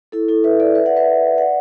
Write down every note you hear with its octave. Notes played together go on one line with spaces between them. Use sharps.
E4 A4
E4 A4
B4 E5
A4 D5
B4 E5
D5 F#5
B4 E5
D5 F#5